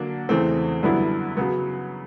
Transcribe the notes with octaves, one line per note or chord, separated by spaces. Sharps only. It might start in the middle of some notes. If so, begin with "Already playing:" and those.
Already playing: D3 F#3 A#3 D4
E2 C#3 E3 A3 C4
F#2 D3 G3 B3 E4
C#3 F#3 B3